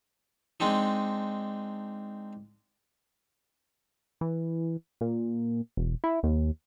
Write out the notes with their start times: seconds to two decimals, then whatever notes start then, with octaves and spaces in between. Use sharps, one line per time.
0.60 G#3 C4 D4 D#4
4.21 E3
5.01 A#2
5.77 E1
6.04 E4
6.23 D#2